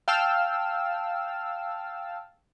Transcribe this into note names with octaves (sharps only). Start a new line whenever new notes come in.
F5 G5 A5 E6 F6